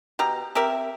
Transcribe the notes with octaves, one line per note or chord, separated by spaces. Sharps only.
B2 G4 A#5
C4 G4 A#4 E5